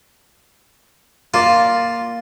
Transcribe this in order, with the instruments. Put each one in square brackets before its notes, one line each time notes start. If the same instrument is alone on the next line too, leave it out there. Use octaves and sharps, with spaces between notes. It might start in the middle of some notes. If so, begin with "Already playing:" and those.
[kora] A#3 D5 [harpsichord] F4